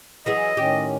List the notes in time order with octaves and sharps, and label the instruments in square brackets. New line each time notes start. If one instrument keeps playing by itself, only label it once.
[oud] E3 F#3 G#4 [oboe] D#5
[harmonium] A2 D#3 C#4 [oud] G4